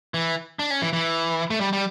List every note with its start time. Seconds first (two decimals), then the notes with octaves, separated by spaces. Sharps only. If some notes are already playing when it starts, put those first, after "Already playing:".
0.14 E3
0.59 D4
0.71 C#4
0.82 E3
0.93 E3
1.50 A3
1.61 G3
1.73 G3